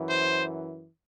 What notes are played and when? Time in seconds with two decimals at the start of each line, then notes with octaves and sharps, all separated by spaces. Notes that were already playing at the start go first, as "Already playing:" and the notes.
Already playing: F#2 E3
0.09 C5